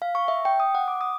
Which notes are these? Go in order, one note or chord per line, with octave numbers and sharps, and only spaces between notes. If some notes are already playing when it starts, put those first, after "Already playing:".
F5
C#6
E5
G5
D#6
F#5
D6
D#6